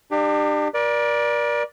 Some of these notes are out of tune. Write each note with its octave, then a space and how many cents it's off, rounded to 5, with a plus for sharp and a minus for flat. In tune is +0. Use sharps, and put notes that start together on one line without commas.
D4 +40 G4 +10
A#4 +40 D5 +0